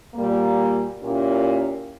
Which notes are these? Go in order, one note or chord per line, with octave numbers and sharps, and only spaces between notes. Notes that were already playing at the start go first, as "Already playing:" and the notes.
A#2 G3 A#3
A#2 A#3 C#4 E4 G4